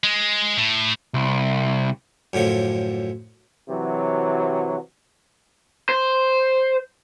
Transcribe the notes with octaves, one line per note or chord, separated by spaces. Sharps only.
G#3
A2
C2
F#2 A2 D3 F3
C3 E3 F#3
C5